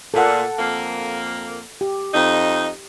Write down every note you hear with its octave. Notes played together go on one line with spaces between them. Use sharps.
A#2 A4 F#5
F2 A#3
G4
F2 D#4